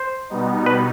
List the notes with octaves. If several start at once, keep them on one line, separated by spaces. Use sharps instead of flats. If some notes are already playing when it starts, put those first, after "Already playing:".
Already playing: C5
B2 G3 B3 D#4
B4